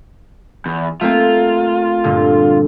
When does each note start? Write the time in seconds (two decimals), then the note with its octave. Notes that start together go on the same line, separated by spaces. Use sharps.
0.66 E2
1.01 A3 A#3 C4 F4
2.04 G2 A#2 D3